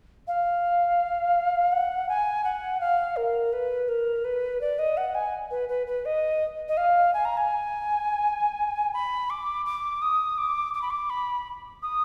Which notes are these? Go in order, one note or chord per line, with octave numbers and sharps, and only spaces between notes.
F5
F#5
G#5
F#5
F5
A#4
B4
A#4
B4
D5
D#5
F#5
G#5
B4
B4
B4
D#5
D#5
F5
G#5
A#5
G#5
B5
D6
D6
D#6
D6
D6
B5
D6
B5
D#6